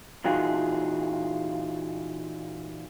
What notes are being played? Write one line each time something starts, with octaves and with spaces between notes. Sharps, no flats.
A#2 E3 D#4 F4 F#4 G#4